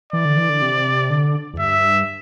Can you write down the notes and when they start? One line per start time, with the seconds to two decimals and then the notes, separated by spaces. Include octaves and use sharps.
0.13 E3 D5
0.25 D3
0.37 E3
0.49 D3
0.62 C3
1.10 D3
1.54 E2
1.59 G2 E5